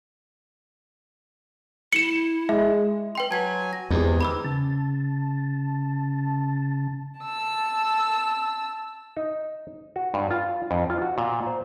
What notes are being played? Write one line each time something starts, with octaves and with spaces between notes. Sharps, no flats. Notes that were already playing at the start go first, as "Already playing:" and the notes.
E4 C#7 E7
G#3 E5
B4 G5 C6
F#3 G#5 A5 G#6 B6
A#6
E2 C3 G#3
D#3 B5 D6 E6
C#3 A5
A5 E6
D#4
F#4
G2
F4
F2
F4
F#4
A#2
C5